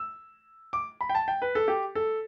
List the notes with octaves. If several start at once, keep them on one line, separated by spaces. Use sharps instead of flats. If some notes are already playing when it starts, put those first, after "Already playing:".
Already playing: E6
D6
B5
G5
A5
G5
B4
A4
G4
A4